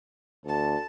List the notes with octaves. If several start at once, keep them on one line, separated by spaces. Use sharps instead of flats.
D2 A4 A5